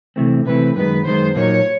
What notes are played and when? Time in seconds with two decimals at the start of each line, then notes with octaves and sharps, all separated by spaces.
0.16 C3 E3 A3 C4
0.46 C3 E3 A3 C4 B4
0.76 F#2 D#3 G#3 B3 B4
1.06 F#2 D#3 G#3 B3 C5
1.36 A#2 F#3 A#3 D#4 C#5